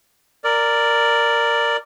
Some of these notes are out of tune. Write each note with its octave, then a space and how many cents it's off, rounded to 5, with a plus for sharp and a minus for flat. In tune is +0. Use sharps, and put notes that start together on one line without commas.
A#4 -10 D5 +0